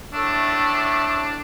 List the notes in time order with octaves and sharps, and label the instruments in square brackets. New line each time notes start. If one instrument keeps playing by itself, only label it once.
[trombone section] A2 A3 [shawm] D4